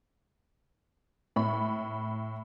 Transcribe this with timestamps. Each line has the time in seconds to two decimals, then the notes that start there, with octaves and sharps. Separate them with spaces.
1.36 A2 B5